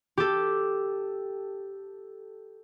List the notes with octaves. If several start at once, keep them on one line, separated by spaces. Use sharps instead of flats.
G4 A4